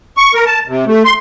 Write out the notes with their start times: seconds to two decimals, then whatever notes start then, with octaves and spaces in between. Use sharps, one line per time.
0.17 C#6
0.34 A#4
0.46 A5
0.67 C3
0.87 A3
1.05 C6